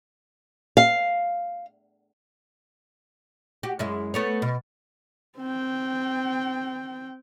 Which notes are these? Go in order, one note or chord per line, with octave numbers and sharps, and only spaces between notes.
F5
F#4 G4
F#2 G#3 E4
A3 B3 C#5
B2
C4 G5